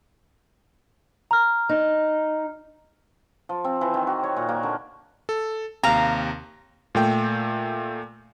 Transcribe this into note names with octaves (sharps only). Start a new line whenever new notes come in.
A#5 F6
D#4
F3
C4
E3
D#3
F#4
C#5
A#2
A#3
D3
A4
D#2 C3 F5 A#5
A#2 A3 G5